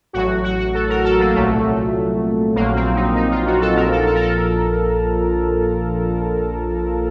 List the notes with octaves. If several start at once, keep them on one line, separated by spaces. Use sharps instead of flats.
A1 A2 F#3 F#4
F#4
F#4
A4
A#4
A4
A#3
C2 A#2 F#3 A3
A#1 A#2 F#3 A#3
C4
D#4
D#4
F4
F#4
A4
A#1 A#2 F3 A#4
A4
A4
A#4
A4